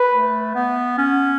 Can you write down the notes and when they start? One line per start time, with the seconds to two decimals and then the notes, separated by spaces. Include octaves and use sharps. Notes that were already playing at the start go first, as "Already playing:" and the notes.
Already playing: B4
0.11 A3
0.55 B3
0.98 C#4